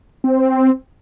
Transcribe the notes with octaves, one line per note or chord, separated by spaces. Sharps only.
C4